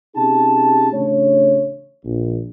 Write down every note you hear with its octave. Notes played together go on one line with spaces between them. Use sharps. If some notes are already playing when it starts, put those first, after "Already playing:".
C3 C#4 D#4 G4 G#4 A5
A1 C#3 A3 D4 C#5
A#1